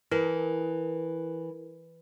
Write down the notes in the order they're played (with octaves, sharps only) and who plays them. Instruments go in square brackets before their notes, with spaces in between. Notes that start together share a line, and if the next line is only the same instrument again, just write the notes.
[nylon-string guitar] E3 [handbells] E4 A#4